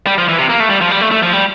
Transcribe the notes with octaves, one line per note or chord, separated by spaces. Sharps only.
G3
F3
E3
C3
A#3
A3
G3
F3
G3
A3
A3
F3
G3